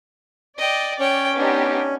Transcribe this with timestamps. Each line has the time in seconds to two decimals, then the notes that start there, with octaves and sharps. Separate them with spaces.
0.59 D5 D#5 G5
0.99 C#4 C#5 G5
1.36 B3 D4 D#4 G4